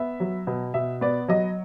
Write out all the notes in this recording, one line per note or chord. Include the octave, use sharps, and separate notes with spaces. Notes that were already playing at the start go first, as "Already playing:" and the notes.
Already playing: B3 E5
F#3
B2
B2 E5
B3 D5
F#3 D#5